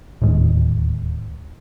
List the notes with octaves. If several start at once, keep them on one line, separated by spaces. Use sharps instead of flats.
D1 D#2 G#2